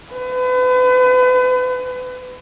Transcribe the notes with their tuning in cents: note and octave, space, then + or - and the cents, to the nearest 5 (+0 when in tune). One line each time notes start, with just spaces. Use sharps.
B4 +35